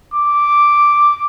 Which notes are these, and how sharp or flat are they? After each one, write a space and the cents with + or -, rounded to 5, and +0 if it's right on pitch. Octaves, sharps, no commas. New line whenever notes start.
D6 +0